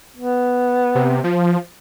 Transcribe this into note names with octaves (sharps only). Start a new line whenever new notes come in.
B3
C3
F3